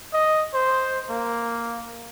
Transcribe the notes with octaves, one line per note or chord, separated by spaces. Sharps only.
D#5
C5
A#3